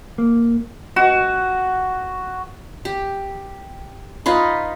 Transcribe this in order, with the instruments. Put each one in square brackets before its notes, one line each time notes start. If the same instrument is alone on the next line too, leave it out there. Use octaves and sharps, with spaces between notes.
[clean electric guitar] A#3
[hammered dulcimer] F#4
[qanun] G4
D#4 F4 B4